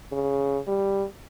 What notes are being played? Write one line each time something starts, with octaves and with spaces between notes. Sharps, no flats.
C#3
G3